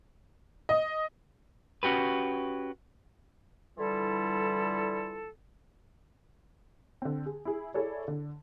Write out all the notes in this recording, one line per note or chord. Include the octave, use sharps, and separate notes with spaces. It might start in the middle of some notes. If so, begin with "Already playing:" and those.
D#5
C#4 F#4 G4 B4
D3 E3 G3 E4 F4 A4
D3 C4
G#4
E4 G#4
E4 G#4 A4 C#5 D5
D3